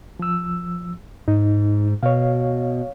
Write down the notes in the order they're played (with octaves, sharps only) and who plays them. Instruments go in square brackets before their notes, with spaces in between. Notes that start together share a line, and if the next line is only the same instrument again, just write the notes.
[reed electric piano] F3 E6
[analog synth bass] G#2 [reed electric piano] D#4
[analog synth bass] B2 [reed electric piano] C#5 F5